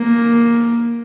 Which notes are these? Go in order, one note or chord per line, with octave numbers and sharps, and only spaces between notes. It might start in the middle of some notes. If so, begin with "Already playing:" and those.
Already playing: A#3